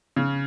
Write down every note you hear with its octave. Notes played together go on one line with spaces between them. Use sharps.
C#3